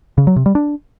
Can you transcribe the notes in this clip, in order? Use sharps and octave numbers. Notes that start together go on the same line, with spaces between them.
C#3
F#3
C3
G3
D4